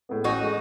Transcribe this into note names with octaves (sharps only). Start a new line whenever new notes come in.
A2 G#3 B3
A1 D#4 F#4
A2 G#3